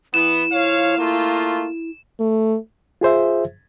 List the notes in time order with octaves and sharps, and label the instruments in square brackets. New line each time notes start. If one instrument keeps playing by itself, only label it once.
[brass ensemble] E3 B3 [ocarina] E4 [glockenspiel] E7
[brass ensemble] F3 C#5 F5
A3 A#3 F4
[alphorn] A3
[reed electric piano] F4 G#4 C5 E5